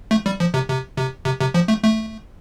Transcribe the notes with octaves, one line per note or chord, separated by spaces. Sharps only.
A3
G3
F3
C3
C3
C3
C3
C3
F3
A3
A3